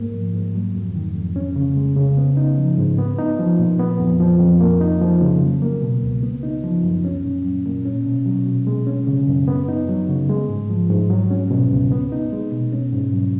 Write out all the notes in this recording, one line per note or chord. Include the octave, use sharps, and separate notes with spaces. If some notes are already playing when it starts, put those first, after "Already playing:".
Already playing: G#2 A#3
F3
G#2
F#3
F2
D#3
F2
C#4
C#3
G#3
C#3
B3
D#4
F3
G#2
B3
D#4
F3
A#2
B3
F2
F3
F2
A#3
D#4
F3
C#3
F#3
A#3
B2
C#2
B3
D#4
F3
F#2
C#4
A#2
F#3
A#2
C#4
B2
F#3
B2
G#3
C#4
C#3
F#2
B3
D#4
F#3
C#3
G#3
G#2
F3
G#2
F#3
C#4
B2
C#2
B3
D#4
G#3
B2
C#4
G#2
F#3